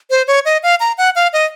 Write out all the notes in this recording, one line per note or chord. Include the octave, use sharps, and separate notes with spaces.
C5
C#5
D#5
F5
A#5
F#5
F5
D#5